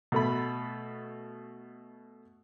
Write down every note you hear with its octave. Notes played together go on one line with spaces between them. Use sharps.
B2 A3 B5